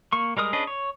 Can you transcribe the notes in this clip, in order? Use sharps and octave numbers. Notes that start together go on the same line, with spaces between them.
A#3 C#6
G3 G#3 A#4 D#6
C#4 D4 G#4 B4 D#5
C#5